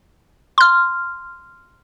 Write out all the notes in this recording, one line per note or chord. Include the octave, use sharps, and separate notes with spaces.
C6 F6